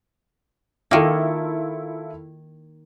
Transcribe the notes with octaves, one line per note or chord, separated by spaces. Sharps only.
D#3 A#3 E4 F4 A4